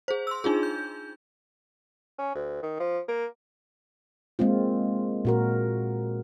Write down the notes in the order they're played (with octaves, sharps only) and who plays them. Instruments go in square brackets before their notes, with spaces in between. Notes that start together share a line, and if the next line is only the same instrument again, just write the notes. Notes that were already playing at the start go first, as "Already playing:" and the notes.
[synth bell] G#4 C5
C6 E6
D4 D#4 F4 G#4
G6
[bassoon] C#4
D2
D#3
F3
A#3
[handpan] G#3 A#3 C4 F4
A#2 F#4 A#4